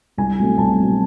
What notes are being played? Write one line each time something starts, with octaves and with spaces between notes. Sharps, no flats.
C2 G#5
B2 F#3 A3 C4
C2 A5
B2 F#3 A3 C4